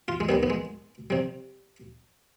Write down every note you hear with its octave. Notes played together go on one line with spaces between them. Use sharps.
F4
G#3
D#2 D#3 G3 B3
B3
G#3
C3 G3